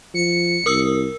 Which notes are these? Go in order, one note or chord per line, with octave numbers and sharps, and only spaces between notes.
F3 C#7
C2 A#4 D#6 E6